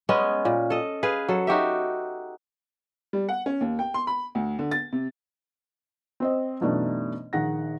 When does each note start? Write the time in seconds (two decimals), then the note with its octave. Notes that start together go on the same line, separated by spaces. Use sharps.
0.09 G#3 B3 C#4 D#5
0.45 A#2
0.70 A4 D#5
1.03 G#4 B4 F5
1.28 F#3 A4
1.47 D#4 F#4 G4 E5
3.13 G3
3.29 F#5
3.46 C#4
3.61 D#2
3.79 G5
3.94 C6
4.07 B5
4.35 D2
4.59 D3
4.71 A6
4.92 C3
6.20 C4 C5 D#5
6.61 F#2 B2 E3 A3 D4 D#4
7.33 A#1 D#3 G#4 F#5 A#6